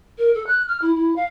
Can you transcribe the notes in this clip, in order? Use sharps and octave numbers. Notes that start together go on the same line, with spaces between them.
A#4
A4
F#6
F6
E4
E4
F5